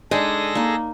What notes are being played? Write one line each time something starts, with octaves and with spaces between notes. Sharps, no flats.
G#3 D4 D#4 G#4 A4 A#6
A#3 D#4